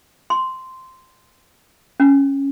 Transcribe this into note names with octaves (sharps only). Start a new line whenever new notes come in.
C6
C#4